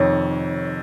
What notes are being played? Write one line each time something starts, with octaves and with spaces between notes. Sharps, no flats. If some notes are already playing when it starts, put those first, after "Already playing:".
Already playing: F1 F2 D#3 C#5